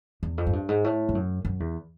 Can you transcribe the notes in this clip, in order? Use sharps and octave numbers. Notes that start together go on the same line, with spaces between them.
E2
F2
G#2
G2
G#2
A2
G2
F#2
F#2
E2